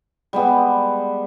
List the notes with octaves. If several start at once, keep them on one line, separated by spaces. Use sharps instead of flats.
G3 G#3 B3